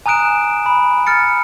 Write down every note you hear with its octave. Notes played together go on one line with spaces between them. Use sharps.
G#5 A#5 D#6 F#6 D7 E7
B5
F6 A6 C#7